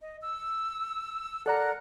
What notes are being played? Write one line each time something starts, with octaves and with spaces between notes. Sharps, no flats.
D#5
E6
A4 A#4 D5 F#5 A#5 F#6